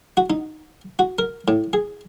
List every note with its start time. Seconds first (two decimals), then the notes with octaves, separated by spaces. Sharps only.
0.17 F#4
0.30 D#4
0.99 F#4
1.19 A#4
1.48 A2
1.73 G#4